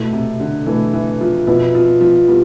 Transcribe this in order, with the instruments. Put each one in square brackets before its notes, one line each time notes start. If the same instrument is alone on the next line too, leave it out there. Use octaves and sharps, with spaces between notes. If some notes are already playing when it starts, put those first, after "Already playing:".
Already playing: [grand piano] B2 A3 E4
[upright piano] C3
D3
[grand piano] B2 A3 E4 [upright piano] E3
[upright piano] E3
F3
[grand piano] B2 B3 E4 [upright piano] F3
[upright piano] F3
F3
[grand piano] B2 B3 E4 [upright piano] G3